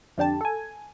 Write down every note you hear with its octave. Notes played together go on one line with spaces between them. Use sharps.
F2 D3 G4 A5
A4 G#5